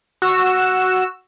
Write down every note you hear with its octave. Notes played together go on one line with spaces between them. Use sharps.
F#4 E6